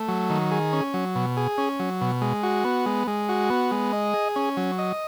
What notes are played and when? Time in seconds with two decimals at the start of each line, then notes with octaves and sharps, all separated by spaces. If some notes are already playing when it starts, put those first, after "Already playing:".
Already playing: A3
0.08 F#3
0.30 D#3
0.51 G#4
0.73 C#4
0.94 F#3
1.15 B2
1.37 G#4
1.58 C#4
1.79 F#3
2.01 B2
2.22 G#3
2.43 F#4
2.65 B3
2.86 G#3
3.07 G#3
3.29 F#4
3.50 B3
3.71 G#3
3.93 D#5
4.14 G#4
4.36 C#4
4.57 F#3
4.79 D#5